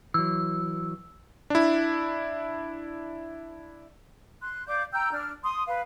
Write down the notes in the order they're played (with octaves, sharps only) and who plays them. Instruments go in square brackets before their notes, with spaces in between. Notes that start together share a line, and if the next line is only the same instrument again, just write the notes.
[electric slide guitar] E3 F#3 [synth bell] E6
[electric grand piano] D4 E4
[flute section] C6 F#6
D5 F5 D6 G6
G5 A#5 E6 G6
D4 F6
C6 D#6
B4 F5